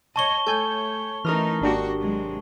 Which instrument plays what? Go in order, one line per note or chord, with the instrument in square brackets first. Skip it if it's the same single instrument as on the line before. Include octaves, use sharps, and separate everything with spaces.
[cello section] C#5 D#5 [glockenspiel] A5 C#6 G7
[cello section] A3 C#5 [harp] A4 [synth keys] G#5 G6
[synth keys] E3 [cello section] A3 C#4 D#4 [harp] A#4 D#6 F6
[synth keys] G#1 D4 G4 [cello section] A#3 F#4
[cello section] C3 F#3 G#3